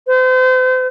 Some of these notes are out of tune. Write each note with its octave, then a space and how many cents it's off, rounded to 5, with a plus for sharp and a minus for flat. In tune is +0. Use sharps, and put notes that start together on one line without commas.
C5 -40